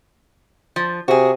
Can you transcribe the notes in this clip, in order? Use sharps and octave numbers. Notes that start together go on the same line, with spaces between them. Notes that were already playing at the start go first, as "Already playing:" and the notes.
F3
C3 F#4 G#4